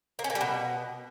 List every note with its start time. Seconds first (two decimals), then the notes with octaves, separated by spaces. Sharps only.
0.19 A#3
0.24 C#4
0.30 A#3
0.35 G3
0.41 B2